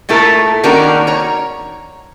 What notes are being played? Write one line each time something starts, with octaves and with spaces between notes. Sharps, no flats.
A#2 A3 E4 A4 A#4
D#3 A#3 C#4 D4 F#4 A#4
C#5 A#5